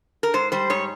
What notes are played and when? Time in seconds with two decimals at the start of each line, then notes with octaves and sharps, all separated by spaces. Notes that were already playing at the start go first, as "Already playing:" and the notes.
0.23 A#4
0.34 G#2 C5
0.52 G3 C5
0.70 G#2 C#5